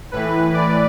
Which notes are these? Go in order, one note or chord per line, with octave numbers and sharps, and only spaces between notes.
A2 E3 B4
D5